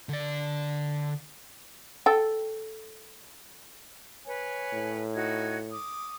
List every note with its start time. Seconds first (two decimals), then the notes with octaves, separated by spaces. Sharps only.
0.09 D3 D5
2.06 A4 G5
4.26 B4 C#5 G#5
4.73 A2
5.15 D#4 F#4 G#6
5.71 D6 D#6